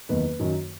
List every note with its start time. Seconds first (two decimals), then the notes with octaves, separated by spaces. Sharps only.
0.09 F#1 E2 D#3 B4
0.39 F#2 D#3 F#3